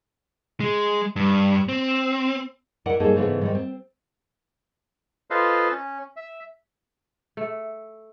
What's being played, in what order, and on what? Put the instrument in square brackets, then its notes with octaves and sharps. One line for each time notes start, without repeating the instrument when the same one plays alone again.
[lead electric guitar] G#3
G2
C4
[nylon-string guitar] E4 A#4 D5 D#5 F#5
G#2 G3 A#3 D#4 G#4 A4
G#2 C#3 E3 A3 B3
G#2 D#3 G3
C4
[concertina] F4 A4 B4 C5 D#5 F5
C#4
E5
[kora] A3